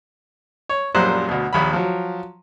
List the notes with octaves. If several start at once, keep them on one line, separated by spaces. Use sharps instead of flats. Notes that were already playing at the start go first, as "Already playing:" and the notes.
C#5
A#1 F#2 A#2 G3 C5 F#6
D2 B2
A#1 D#2 B5
F3 F#3